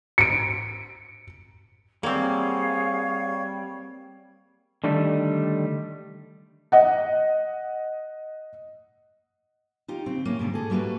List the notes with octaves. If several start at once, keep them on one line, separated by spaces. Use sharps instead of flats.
C#7 D7
G3 A#3 C4 G#4 C#5 F5 F#5
D3 D#3 G3 A3 D4
D#5 F#5
D#4 F4 G4
C#3 C4
A2 A#3 C#4
G#2 B2 D3 G3
G#4 A4
G3 A3 A#3 F#4 B4